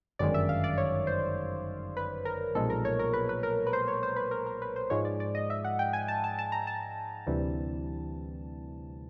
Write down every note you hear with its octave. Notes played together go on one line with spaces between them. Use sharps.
G1 F#2 D#3 G#3 D5
E5
F5
D5
C#5
C5
B4
A#4
B1 A#2 F3 G#3 A4
A#4
C#5
A#4
B4
B4
A#4
B4
C5
C#5
C5
B4
A#4
A#4
B4
C5
G#2 F3 G#3 C#5
D5
D5
D#5
E5
F#5
G5
G#5
A5
A5
A5
A#5
A5
D2 C3 E3 G3